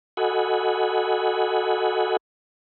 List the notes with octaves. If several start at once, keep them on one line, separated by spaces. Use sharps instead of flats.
F#4 A4 D#5 F#5 G#5 B5